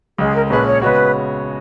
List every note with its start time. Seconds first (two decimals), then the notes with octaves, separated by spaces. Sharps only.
0.18 C#2 C#3 G#3 G#4
0.34 A#4
0.46 A#4
0.50 A#1 A#2 G#3 C#4 G#4 B4
0.66 C#5
0.82 C#3 G#3 B3 F#4 B4 C#5